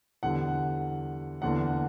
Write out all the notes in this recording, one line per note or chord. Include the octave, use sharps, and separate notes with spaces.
E2 D3 G3 F#5
E2 D3 A#3 F#5